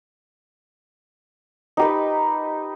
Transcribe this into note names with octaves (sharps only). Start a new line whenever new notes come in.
D#4 G4 B4